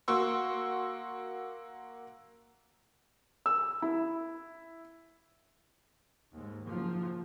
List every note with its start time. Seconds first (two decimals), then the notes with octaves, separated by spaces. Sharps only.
0.08 A#3 F#4 C6 C#6 E6
3.46 E6
3.82 E4
6.33 D#2 G#2
6.65 F#1 F3